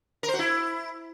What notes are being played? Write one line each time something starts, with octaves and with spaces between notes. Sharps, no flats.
A#4
C5
F#4
E4